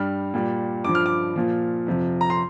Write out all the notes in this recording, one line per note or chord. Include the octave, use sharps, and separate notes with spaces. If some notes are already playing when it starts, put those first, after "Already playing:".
Already playing: G2 G3 F6
A#2 G3
G2 F3 D6
F6
D6
A#2 F3
F2 C3 F3
A#5
C6